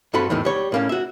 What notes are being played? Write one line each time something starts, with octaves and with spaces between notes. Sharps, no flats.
G2 C4 F#4 A4 B5 C6
E2 A2 D#3
G3 C#5
A2 A#3 C#4
F#4 E5